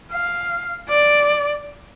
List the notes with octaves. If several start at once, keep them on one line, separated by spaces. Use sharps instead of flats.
F5
D5